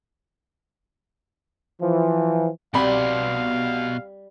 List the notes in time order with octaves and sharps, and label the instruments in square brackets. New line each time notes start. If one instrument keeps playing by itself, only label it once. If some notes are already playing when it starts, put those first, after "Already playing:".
[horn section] E3 F3
[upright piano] C2 B5 [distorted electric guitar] B2 C6 [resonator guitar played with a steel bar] G3 [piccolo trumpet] F5